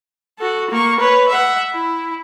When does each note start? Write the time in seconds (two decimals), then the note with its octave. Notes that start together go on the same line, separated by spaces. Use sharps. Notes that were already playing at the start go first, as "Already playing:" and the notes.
0.38 F#4 A4
0.70 A#3 C#6
1.00 B4 C#5
1.28 E5 F#5
1.73 E4